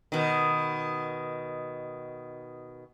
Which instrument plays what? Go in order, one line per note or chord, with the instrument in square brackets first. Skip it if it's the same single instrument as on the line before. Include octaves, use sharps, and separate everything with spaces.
[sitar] B2 D#3